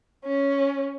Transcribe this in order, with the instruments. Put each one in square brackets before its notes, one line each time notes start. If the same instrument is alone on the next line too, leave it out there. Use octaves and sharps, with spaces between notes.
[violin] C#4